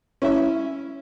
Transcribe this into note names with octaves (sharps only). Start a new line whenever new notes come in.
C#4 E4 E5